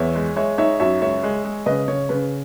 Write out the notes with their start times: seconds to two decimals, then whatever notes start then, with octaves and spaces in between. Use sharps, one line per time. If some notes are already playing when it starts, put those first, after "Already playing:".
Already playing: E2 C#5 E5
0.15 G#3
0.36 G#3 C#5 E5
0.58 D#4 C#5 E5
0.80 F#2 C#5 E5
1.02 C#2 C#5 E5
1.23 G#3
1.45 G#3
1.66 C#3 B4 D#5
1.88 C#3 C#5
2.09 C#3 B4